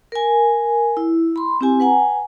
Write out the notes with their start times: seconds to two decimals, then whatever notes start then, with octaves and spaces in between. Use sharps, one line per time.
0.12 A#4 G#5
0.97 E4
1.36 B5 C6
1.61 C4 E4 G4 G#5
1.80 B4 F#5 G#5 A#5